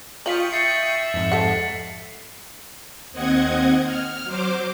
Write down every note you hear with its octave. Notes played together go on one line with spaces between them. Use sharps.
F4 D#5 F5 G5 C#6 D#6 B6 F#7
E5 A6 C7 C#7
A6
F2 G#2
A4 F#5
D#2 C4 D#5 F#5 G#6
F6
F#3 C5 D6